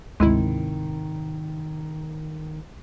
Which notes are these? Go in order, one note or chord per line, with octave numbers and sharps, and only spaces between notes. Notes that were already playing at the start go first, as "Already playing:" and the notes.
G#1 D2 G#2 C3 D#3 G#3 C4 E4